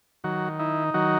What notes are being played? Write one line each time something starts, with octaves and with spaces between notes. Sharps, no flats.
D#3 F#3 F#4
D#4 E4
D#3 F#3 F#4